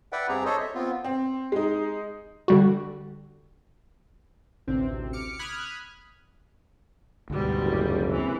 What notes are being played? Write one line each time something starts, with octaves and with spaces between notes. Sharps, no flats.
B4 D5 E5 F#5 G5
G2 C4 G4 G#4 A#5
A4 C5 C#5 D#5
E5
B3 C4 F4
C4
G#3 D#4
D3 G3 F#4
A1 D2 C3 C4
D6 F6 C#7
B5 D#6 F6 F#6 G#6
D2 G#2 B2 G3
F#1
C3 E3